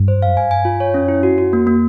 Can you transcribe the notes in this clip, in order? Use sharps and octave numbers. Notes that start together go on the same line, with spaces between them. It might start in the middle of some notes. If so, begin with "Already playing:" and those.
Already playing: G2
C5
F#2 F5
G2 G#5
G#5
F4
C#5
F#2 C#4
E4
F#4
F#4
F2 A#3
A#3